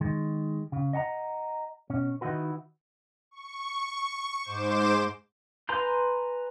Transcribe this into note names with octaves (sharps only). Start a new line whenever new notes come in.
D#3 G#3
C#3
D#5 F#5 A5 A#5
B2 C#4
D#3 D#4 E4 F#4 B4
C#6
G#2 C5 D6 E7
B4 G#5 A#5 C6 G6